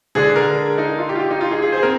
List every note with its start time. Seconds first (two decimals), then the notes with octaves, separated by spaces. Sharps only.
0.15 D3 G#3 D4 G#4
0.36 A#4
0.78 D#4
0.99 F4
1.09 G4
1.15 F4
1.19 G4
1.30 D#4
1.41 F4
1.51 G#4
1.62 G#4
1.72 C5
1.78 G#4
1.83 C4 A#4